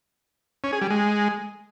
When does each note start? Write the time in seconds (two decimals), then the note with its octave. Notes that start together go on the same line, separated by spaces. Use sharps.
0.64 C#4
0.73 G#4
0.81 G3
0.90 G#3